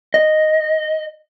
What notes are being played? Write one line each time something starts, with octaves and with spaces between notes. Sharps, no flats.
D#5